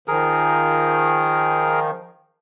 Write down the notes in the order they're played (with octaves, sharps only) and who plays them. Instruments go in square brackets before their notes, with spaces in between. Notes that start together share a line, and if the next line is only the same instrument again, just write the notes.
[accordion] D#3 F3 [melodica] G#4 A#4